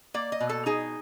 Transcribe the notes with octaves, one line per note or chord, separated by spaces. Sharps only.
A#3 D5
D#5
B2
A4
D#4 G#4